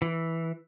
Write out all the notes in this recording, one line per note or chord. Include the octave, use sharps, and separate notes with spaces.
E3